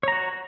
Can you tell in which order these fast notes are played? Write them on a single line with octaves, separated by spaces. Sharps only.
C#5 A#5 F#4